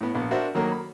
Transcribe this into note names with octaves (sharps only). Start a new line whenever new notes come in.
A2 B3
A#1 B3
D4 F#4 A#4 C5 E5
D#3 F#3 A3 A#3
B5